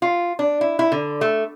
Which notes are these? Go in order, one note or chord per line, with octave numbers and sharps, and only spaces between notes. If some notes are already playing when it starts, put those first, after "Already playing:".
F4
D4
E4
E4
D3
A3